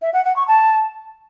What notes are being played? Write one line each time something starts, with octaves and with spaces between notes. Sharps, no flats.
E5
F#5
F#5
C#6
A5